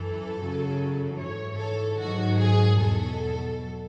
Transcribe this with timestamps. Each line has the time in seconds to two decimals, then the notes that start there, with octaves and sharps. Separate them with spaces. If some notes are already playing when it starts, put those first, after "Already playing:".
Already playing: F#2 E3 A4
0.39 F#2 C#3 F#3
1.19 G#2 E3 C#5
1.59 A4
2.00 G#2 D#3 F#3 F#4
2.40 G#4
2.81 E2 B2 F#3 A4